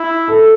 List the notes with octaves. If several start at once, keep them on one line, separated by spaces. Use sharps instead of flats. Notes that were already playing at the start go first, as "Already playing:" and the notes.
Already playing: E4
A4